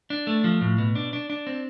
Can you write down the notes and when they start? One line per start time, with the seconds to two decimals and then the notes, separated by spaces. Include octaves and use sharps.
0.10 D4
0.27 A3
0.44 F3
0.61 A2
0.78 B2
0.95 D4
1.13 D4
1.30 D4
1.47 C4